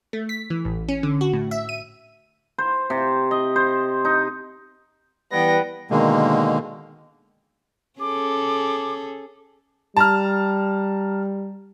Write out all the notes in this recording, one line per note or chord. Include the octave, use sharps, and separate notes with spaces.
A3
B6
E3
A1
C#4
D3
F#4
A2
E5
D#7
C5
C3
D#5
C5
D#4
E3 G3 B3 G5 A#6
B2 D3 D#3 G#3 A#3
C#4 G#4 A4 D6
G3 A5 A#5 F6